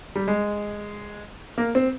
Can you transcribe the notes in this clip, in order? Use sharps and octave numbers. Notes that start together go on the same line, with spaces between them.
G3
G#3
A#3
C4